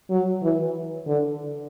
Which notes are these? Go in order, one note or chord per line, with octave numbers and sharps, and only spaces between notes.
F#3
E3
D3